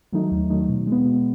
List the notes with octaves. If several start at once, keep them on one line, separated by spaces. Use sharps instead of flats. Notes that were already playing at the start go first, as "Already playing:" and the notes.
D#3 F#3 A3 D#4
D#2
D#3 F#3 A3 D#4
B2
G#3 B3
B2